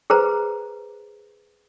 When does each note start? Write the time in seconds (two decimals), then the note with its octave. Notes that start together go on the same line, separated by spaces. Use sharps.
0.10 G#4 B4 C5 A#5